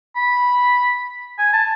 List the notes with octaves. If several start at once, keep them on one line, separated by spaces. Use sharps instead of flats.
B5
G#5
A5